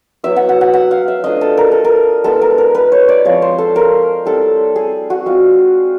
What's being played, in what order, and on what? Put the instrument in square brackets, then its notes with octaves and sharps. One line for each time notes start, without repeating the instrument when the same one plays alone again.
[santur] F#3 B3 E4 E5
F#5
F#5
F#5
F#5
F5
E5
A3 D4 F4 D#5
A4
A#4
A4
A#4
G#3 B3 E4 A4
A#4
A#4
B4
C#5
D5
F3 G#3 C4 C#5
C5
A4
A#4
G3 C4 E4 A4
G#4
F#4
G#3 C4 F4